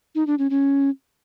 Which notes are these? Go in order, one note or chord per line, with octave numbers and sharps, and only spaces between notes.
D#4
D4
C#4
C#4